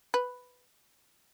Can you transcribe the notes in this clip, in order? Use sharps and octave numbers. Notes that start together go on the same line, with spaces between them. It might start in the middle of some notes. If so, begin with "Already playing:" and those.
B4